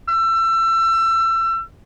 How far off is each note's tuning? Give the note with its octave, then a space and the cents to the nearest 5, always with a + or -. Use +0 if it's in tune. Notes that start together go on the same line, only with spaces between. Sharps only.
E6 +30